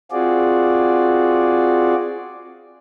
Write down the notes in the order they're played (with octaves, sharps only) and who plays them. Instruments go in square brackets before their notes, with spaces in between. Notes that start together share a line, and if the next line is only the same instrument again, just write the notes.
[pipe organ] C4 F4 F#4 G#4 D5